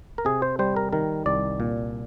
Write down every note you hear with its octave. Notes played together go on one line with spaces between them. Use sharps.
A#4
C3 G#4
C5
G3 C5
A#4
D#3 A#4
C2 D5
A#2